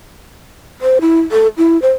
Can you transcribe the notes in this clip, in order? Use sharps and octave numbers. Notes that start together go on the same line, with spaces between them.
C5
E4
A4
E4
C5